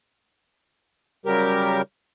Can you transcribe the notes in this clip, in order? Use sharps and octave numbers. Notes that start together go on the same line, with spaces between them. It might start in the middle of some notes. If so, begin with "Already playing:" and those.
C#3 F#3 G3 G4 A#4